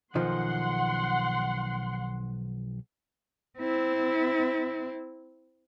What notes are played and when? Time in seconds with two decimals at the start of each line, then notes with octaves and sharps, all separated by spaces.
0.15 B1 D#3 F3 F#5 C6
3.59 C4 E4